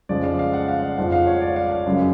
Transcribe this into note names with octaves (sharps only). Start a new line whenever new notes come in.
F2 C#3 F3 G#3 D5
F5
F5
F#5
F5
D5
F2 F3 G#3 F#5
F5
C#5
D5
F5
F5
F#2 C#3 G#3